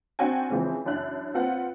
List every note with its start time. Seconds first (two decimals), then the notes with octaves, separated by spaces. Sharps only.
0.19 C4 D4 F#4 G5 G#5
0.50 C#3 E3 F3 G#3 C4
0.86 F#2 D4 E4 F#6
1.34 C4 F4 B4 F#5